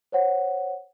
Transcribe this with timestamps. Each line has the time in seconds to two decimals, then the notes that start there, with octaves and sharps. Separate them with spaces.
0.12 C5 C#5 F#5